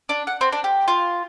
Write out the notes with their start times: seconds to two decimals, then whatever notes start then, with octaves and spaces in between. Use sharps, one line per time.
0.09 D4
0.27 F#5
0.41 C4
0.52 D4
0.64 G4
0.88 F4